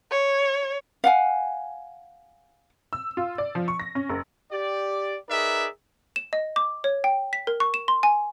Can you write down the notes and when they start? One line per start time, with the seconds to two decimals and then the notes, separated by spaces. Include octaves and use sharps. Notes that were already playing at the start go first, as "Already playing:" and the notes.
0.11 C#5
1.04 F5 F#5 G#5
2.93 E6
3.17 F4
3.38 D5
3.55 F3
3.68 C#6
3.80 A#6
3.95 C#4
4.10 F#1
4.52 G4 D5
5.29 D#4 G#4 A#4 B4 D5 E5
6.16 E7
6.33 D#5
6.56 D6
6.84 C#5
7.04 G5
7.33 B6
7.47 A#4
7.60 C#6
7.74 E7
7.88 C6
8.03 G#5